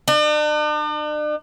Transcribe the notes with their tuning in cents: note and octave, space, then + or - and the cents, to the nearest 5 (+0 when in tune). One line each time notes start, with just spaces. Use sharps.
D4 +45